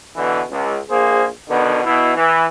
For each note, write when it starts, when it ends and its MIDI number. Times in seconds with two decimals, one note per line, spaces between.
0.16 0.42 47
0.16 0.42 50
0.16 0.42 52
0.50 0.77 37
0.90 1.28 34
0.90 1.28 58
0.90 1.28 68
0.90 1.28 72
1.50 1.82 47
1.50 1.82 50
1.50 1.82 51
1.50 1.82 59
1.84 2.15 47
1.84 2.15 64
2.15 2.44 52